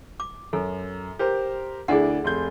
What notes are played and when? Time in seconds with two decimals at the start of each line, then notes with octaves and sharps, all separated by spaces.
0.20 D6
0.53 F#2 A4
1.19 G4 A#4 C5
1.88 D2 D4 E4 G#4 F#5
2.24 F1 C6 G6